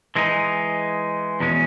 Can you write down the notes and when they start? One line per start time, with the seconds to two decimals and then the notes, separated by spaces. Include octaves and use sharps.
0.15 E3 G#3 D#4
1.40 E2 B2 G#3 C#4